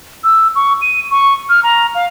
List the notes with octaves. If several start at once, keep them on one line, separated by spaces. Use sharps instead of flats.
E6
C#6
D#7
C#6
F6
A#5
F5